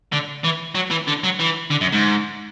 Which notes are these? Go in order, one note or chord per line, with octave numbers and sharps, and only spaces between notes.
D3
E3
F#3
E3
D3
F#3
E3
D3
F#2
G#2